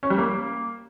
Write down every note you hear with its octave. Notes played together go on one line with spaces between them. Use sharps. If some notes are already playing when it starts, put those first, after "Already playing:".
C#4
G3
A#3